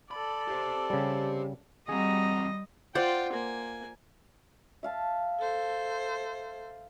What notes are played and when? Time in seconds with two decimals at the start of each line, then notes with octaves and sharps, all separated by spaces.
0.11 A4 D5 B5
0.48 G4 C5
0.90 C#3 G3
1.89 E2 G3 C4 F#4 G#4 D#5 A#5
2.95 F4 C5 D5 F#5 G5
3.32 A#3 G#5
4.83 E5 F5 A5
5.40 A4 C5